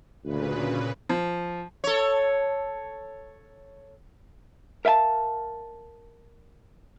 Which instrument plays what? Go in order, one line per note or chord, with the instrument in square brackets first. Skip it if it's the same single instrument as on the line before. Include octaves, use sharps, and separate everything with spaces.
[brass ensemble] D2 [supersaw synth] A#2 C#3 B4
[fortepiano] F3
[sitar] A4 C#5
[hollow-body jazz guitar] A#4 E5 F5 G#5 A5